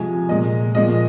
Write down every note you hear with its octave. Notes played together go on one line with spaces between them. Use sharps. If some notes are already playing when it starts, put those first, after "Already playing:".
Already playing: C3 F3 G#3 G#5
A#2 G#3 D#5
A#2 F3 G#3 D#5